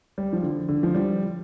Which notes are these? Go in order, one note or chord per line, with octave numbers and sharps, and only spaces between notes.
G3
F3
D3
D3
F3
G3